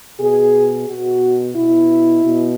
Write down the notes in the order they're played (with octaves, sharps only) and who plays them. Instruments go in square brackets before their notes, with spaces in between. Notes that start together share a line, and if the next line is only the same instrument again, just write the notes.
[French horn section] B2 G#4
B2 F#4
B2 E4
B2